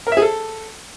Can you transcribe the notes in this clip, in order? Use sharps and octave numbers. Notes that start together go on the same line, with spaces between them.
A#4
E5
G#4
A4